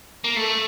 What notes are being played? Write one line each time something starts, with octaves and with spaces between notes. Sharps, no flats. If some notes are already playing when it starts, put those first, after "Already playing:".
A#3
A3